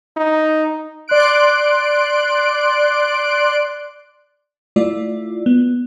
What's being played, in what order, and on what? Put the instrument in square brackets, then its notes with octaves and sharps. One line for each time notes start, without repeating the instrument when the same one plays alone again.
[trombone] D#4
[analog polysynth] D5 C6 F#6 D7
[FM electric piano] A3 E4 F4 D5
B3